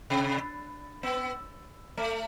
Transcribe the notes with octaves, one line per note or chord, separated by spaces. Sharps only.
C3
B3
A3